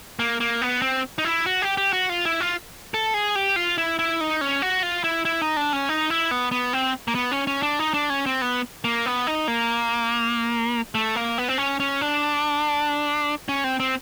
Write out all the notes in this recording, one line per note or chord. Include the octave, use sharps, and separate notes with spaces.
A#3
A#3
B3
C4
D#4
E4
F#4
G4
G4
F#4
F4
E4
F4
A4
G#4
G4
F4
E4
E4
D#4
C#4
F#4
F4
E4
E4
D#4
D4
C#4
D#4
E4
B3
B3
C4
A#3
B3
C#4
C#4
D4
D#4
D4
C#4
C4
B3
A#3
B3
D#4
A#3
A3
A#3
B3
C4
C#4
C#4
D4
C#4
C4
C4